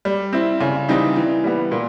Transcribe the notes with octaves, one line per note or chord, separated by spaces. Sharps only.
G3
C4 E4
C#3
E3 G3 C4 D#4
E3
G3 B3
A#2